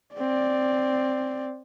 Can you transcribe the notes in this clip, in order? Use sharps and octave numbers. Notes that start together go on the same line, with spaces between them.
C4 D5